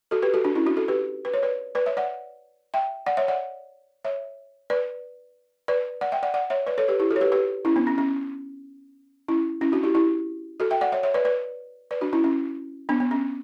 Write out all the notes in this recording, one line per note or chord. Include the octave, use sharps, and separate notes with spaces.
F#4 A4
G4 B4
F#4 A4
D4 F#4
C#4 E4
D4 F#4
F#4 A4
G4 B4
B4
C#5
B4 D5
B4 D5
C#5 E5
D5 F#5
E5 G5
D5 F#5
C#5 E5
D5 F#5
C#5 E5
B4 D5
B4 D5
D5 F#5
E5 G5
D5 F#5
D5 F#5
C#5 E5
B4 D5
A4 C#5
G4 B4
E4 G4
F#4 A4
C#5
G4 B4
G4 B4
C#4 E4
B3 D4
C#4
C#4
C#4 E4
C#4 E4
D4 F#4
E4 G4
E4 G4
F#4 A4
E5 G5
D5 F#5
C#5 E5
C#5 E5
B4 D5
B4 D5
B4 D5
D4 F#4
C#4 E4
C#4
B3 D4
B3
C#4